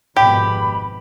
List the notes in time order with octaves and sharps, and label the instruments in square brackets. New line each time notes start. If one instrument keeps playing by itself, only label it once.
[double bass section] G#1 F2 B2 [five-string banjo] G4 [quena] B5